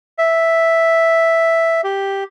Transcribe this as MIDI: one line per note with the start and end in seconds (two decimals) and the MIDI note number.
0.18 1.81 76
1.84 2.24 67